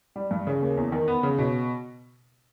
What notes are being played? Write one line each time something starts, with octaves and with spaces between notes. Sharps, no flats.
G3
G2
C#3
D#2
E2
D#3
B3
C#3
B2